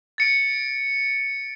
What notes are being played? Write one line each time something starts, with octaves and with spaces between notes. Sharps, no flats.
A6 C#7 D7